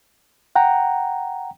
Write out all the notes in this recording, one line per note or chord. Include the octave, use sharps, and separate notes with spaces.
F#5 G5 A#5